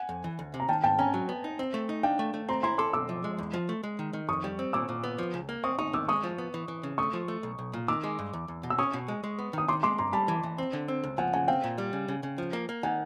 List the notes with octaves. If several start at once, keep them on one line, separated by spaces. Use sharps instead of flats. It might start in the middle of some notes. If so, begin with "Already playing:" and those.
Already playing: F#5 G#5
F2
E3
D2
C3
A#5
D#3 G5 A5
G#2 G5 A5
C#4 G#5 A#5
F#3
B3
D#4
C4
A3
D#4
D4 F5 G5
A3
A3
C4 A#5 C6
E4 A#5 C6
A4 C6 D6
B1 D6 E6
F3
G#3
E2
F3
A3
G#3
D#3
D#3
F2 C#6 D#6
G3
C4
A#2 D6 E6
A#2
B3
F3
C#2
A#3
C4 C#6 D#6
D#4 C#6 D#6
D#3 D6 E6
G#3 C#6 D#6
F3
B3
E3
E3
C#3
A3 C#6 D#6
F3
A3
B1
B1
A#2
D#3 D6 E6
G#3
G2
E2
E2
B2
E6
C#4 C#6 D#6
B2
G#3
G#3
B3
D#3 D#6
D#3 C6 D6
G#3 C6 D6
G2 A#5 C6
G3 A5 B5
E3
E3
C4
D3
C4
C#2
F3 F#5 G#5
C#3 F#5 G#5
C4 F5 G5
A#2
G3
C#3
C#3
C#3
F3
A#3
A#3
D#3 F#5 G#5